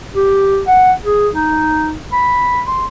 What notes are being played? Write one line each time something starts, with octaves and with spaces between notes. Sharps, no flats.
G4
F#5
G#4
D#4
B5
C6